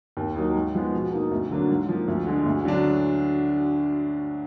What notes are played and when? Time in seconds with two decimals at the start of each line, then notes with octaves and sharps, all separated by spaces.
0.17 D#2
0.36 D#3 F#3 A#3 D#4
0.55 G#2
0.74 F3 G#3 B3
0.93 B2
1.12 A#3 D#4
1.31 D2
1.51 D3 F#3 A#3 D4
1.69 G#2
1.89 F3 A#3
2.08 D2
2.26 D3 G#3
2.46 D2
2.65 D3 F#3 D4